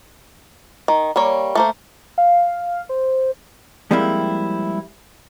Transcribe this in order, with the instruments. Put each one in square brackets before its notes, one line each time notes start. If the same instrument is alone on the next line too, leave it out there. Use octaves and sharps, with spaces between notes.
[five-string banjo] D#3
G3 A#3 C#5
A3 A#3 C5
[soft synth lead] F5
C5
[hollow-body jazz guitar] F3 G3 G#3 A#3 C4 E4